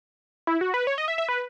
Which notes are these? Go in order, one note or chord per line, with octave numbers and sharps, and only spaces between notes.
E4
F#4
B4
C#5
D#5
E5
E5
B4